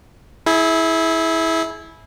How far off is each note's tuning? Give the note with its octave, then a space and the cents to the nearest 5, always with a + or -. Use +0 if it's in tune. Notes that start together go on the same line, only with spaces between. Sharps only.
E4 -15 G#4 +30